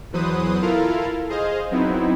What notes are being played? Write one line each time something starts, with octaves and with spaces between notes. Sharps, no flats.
E2 E3 F#3 B4 C5 D#6
E4 F4 A4 A#4 F5
G#4 C5 D#5 F5
F#3 B3 C4 D#4 E4